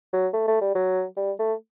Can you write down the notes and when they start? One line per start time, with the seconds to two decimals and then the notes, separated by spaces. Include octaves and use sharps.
0.13 F#3
0.33 A3
0.48 A3
0.61 G3
0.75 F#3
1.17 G3
1.39 A3